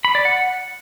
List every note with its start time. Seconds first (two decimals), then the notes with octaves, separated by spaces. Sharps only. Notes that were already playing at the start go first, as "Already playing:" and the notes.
0.05 B5
0.15 D5
0.25 F#5